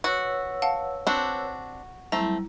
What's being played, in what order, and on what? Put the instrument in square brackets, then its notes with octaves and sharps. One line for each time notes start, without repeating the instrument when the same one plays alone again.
[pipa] F#4 [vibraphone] B4 C#5 E6
[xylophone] F5 F#5 A5
[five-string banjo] C4 D4 [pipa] F#4
[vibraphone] F#3 G3 E4 [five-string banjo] A3 C4 [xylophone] A#5